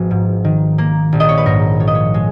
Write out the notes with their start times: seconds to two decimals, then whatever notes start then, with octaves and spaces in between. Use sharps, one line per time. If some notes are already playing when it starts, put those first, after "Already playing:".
Already playing: G#1 F3 B3 F#4
0.11 G#2
0.45 D#3
0.78 A#3
1.12 A#1
1.20 D#5
1.29 C#5
1.38 B4
1.46 G#2 A#4
1.80 F3 C#5
1.87 D#5
1.95 C#5
2.14 G#3